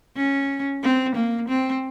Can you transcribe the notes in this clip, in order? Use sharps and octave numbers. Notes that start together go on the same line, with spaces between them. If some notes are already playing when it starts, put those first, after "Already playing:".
C#4
C4
A#3
C4